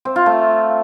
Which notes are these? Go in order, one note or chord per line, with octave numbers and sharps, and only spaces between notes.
C4
F4
A3